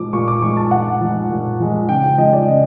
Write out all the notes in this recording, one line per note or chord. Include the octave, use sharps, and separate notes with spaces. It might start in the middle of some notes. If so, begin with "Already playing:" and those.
Already playing: A#2 F3 G#3 D6
A#2 C#6
D6
F3 G#3 C#6
A5
A#2 F#5
F3 G#3
A#2
F3 G#3
C#3 G5
G5
F3 G#3 D#5
D5
C#3 D#5